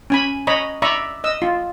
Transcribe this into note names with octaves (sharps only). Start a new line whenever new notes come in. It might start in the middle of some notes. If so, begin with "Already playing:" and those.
C#4 G#5 B5
C#5 D#5 A#5 B5
D5 E5 A#5 B5 C#6
D#5 E6
F4